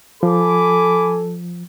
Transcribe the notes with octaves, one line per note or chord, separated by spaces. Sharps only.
F3 A4 G#5 B5 D6